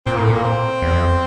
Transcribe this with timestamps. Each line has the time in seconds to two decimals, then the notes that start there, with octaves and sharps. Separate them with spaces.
0.07 A#2 C4
0.16 A2 A#3
0.24 A3
0.30 A#2 A#3
0.44 C4
0.82 E2
0.93 F2